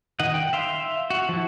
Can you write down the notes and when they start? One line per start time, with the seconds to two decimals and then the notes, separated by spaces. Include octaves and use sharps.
0.19 D#3 D#5 F#5
0.34 G5
0.53 E5 F5 C6
1.10 F#4
1.29 F3 E4